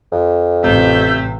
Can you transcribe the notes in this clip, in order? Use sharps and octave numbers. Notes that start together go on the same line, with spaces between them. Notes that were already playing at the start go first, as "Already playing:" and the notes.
F2
A1 C3 E5 G6